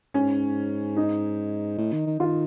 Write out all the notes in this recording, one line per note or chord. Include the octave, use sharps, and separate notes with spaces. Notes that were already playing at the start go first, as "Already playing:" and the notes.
G#2 C#4
D#4
A2
D#3
D#3
D#3 F4